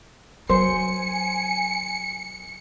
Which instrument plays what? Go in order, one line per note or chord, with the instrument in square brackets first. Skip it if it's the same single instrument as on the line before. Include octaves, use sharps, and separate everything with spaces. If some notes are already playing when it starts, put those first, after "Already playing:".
[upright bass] F#3 [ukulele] C5 [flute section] G#5 [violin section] C#7